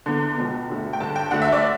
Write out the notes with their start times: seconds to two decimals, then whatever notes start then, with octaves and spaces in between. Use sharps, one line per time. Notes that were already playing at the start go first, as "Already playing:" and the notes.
0.06 E2 D3
0.38 C#2 B2
0.69 D2 D3
0.93 G5
1.00 G2 D3 A5
1.16 G5
1.31 D2 D3 F#5
1.42 E5
1.52 D5